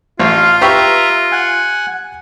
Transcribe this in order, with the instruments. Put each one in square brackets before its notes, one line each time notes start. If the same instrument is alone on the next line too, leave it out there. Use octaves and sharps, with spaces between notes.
[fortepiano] A1 [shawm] F4 [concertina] F5
[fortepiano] G4 B4 C#6 [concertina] E5 A#5
[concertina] F#5 G#5